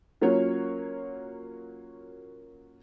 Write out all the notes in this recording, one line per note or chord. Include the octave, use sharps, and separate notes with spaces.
F#3 A#3 C#4 F4 F#4 C#5